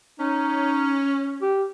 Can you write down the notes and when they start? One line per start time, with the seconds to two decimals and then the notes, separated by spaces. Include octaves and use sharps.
0.20 C#4 D#4
1.42 G4